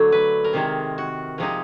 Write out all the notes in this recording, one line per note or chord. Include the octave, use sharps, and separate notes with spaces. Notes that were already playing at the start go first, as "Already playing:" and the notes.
Already playing: D3 F#3 A3
B4
A#4
C3 D#3 G#3
F#4
C3 F3 G#3 D#4